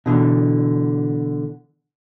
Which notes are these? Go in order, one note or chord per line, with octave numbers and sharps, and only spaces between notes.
B2 D3 E3